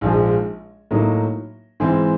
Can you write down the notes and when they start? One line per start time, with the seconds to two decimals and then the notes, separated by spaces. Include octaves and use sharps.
0.01 A#1 G#2 F3 G#3
0.91 A2 F#3 A#3 D#4
1.80 G#2 E3 G#3 C4